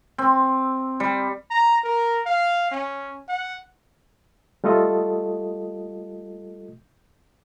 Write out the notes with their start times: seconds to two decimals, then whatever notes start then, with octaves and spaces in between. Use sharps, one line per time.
0.18 C4
1.00 G3
1.51 A#5
1.84 A#4
2.26 F5
2.71 C#4
3.29 F#5
4.64 G3 A3 F4 A4 D#5